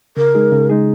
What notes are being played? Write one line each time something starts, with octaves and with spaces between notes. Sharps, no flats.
C#3 A#4
G#3 D#4 G#4
C#3
G#3 D#4 G#4